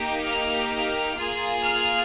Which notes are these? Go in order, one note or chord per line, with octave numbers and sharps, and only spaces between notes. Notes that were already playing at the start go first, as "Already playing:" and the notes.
Already playing: A#3 D#4 G4
F6
A#3 F4 G#4
F6